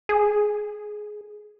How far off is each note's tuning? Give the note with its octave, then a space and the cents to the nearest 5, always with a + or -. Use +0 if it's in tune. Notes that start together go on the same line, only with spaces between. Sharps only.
G#4 +15